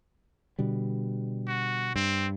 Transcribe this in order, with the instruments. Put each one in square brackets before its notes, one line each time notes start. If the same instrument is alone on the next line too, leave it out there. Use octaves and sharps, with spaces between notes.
[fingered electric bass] B2 D3 G3
[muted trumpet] F#4
[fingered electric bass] G2 [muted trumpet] C4